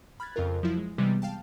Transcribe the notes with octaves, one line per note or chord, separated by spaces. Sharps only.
B5 F6 F#6 G#6 A6
F2 C#3 F4 A#4
F3 F#3 E4
G#3
C3 E3 G3 G#3 B3
F5 G5 A5